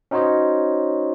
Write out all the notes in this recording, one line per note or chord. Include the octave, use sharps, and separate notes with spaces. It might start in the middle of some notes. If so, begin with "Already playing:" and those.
C#4 D#4 F#4 C5 C#5 D#5